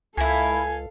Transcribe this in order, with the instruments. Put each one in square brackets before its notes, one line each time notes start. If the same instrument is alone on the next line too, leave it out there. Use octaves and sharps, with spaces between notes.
[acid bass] C#2 [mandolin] A#3 E4 [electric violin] A4 F5 [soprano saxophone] G#5